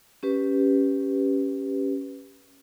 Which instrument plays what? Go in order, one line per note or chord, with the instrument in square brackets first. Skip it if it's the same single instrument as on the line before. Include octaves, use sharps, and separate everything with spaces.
[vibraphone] C#4 G4 B4